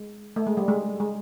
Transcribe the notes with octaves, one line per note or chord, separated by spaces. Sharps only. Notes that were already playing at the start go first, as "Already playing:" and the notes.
Already playing: G#3
A3
G#3
G3
G#3
G#3